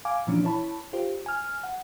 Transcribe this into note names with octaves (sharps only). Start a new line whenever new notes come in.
F5 G#5 D6
A#2 E3 F3 C#4 D4
E4 C#5 A5 B5
F4 G4 C5
G#5 F6
F#5